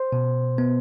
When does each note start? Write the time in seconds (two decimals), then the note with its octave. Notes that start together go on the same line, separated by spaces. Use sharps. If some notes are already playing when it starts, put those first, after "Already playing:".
Already playing: C5
0.12 B2
0.58 B3